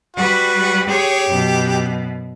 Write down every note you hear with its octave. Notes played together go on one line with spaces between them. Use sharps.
G3 F#4 B4
G4 G#4 C#5
F#2 B2